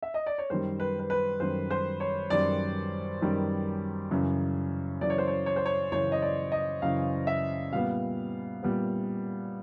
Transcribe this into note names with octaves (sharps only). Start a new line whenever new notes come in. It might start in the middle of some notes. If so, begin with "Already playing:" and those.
E5
D#5
D5
C#5
F#2 D#3 G3 C5
B4
B4
B4
F#2 D#3 G3 C5
C5
C#5
F#2 D#3 G3 D5
F#2 D#3 G3
F#2 C#3 E3
F#2 C#3 E3 D5
C#5
C5
C#5
C#5
C5
C#5
F#2 C#3 E3 C#5
D#5
D5
D#5
F#2 C#3 E3 F5
E5
A#2 G3 B3 F5
A#2 G3 B3